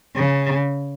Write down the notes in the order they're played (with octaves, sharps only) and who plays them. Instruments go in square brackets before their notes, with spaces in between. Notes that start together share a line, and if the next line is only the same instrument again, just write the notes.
[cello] C#3